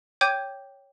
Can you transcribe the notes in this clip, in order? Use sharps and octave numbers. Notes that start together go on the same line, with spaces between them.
C#5 G5 D6 G6 G#6 D#7